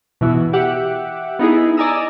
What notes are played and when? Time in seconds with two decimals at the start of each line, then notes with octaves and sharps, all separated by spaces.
0.21 B2 E3 E4 F#4
0.53 G4 E5 F#5 D6
1.39 B3 D#4 E4 G#4
1.77 D5 D#5 G#5 A#5 D#6 E6